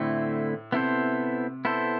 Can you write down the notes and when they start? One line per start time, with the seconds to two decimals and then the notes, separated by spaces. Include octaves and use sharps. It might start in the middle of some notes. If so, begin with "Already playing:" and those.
Already playing: A2 D3 A3 C4 E4
0.72 C3 B3 E4 A4 C5
1.65 B3 E4 A4 C5